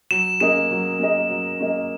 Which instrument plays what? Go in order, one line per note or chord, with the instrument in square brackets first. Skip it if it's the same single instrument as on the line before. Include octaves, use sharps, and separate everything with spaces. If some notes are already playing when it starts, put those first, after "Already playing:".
[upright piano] F#3 [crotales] E7
[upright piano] A#3 C#4 G#4 D#5 [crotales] E7
[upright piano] F#3
A#3 C#4 G#4 D#5
F#3
A#3 C#4 G#4 D#5